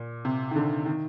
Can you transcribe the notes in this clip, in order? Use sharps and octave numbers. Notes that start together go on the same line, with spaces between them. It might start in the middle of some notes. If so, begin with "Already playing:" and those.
Already playing: A#2
C3
D#3
D3
D#3